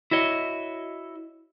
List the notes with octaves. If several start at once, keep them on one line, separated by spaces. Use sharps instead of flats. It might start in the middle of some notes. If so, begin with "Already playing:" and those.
E4 F#4 C#5 D#5